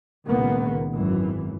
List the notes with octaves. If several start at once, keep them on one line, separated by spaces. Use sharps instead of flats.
C#2 A#2 D#3 A#3 B3
G#1 F#2 E3